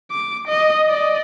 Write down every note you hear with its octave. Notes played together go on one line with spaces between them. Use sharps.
D6
D#5
D5 D#5